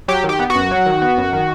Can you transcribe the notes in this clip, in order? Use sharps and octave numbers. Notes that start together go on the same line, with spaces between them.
F#3 G4
D#3
G4
B3
F#4
F#2
F#3
D#3
B3
F#2
D#3